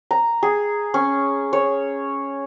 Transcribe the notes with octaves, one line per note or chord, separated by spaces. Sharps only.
A#5
G#4
C#4
C#5